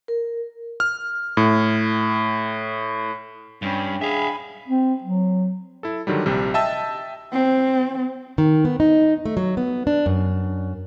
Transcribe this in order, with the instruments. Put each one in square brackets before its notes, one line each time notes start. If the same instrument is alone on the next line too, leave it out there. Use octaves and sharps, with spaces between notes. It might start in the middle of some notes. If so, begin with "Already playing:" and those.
[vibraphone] A#4
[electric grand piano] F6
A2
[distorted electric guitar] G2 [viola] C#4 B5 [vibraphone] D4 G5
[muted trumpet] G#4 [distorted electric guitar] E5 F5 [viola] G#5 B5
[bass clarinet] C4
F#3
[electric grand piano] E4 A4
D3 D#3 F#3 G3
A#1 C3 G3
D#5 E5 G5 A5 E6
[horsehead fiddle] C4
[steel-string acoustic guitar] D#3
B3
D#4
A3
F#3
B3
D4
F#2